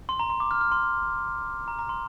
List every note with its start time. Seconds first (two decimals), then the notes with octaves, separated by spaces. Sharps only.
0.09 C6
0.19 A#5
0.30 C6
0.40 D6
0.51 F6
0.61 F6
0.72 C6
1.68 A#5
1.79 A#5
1.89 C6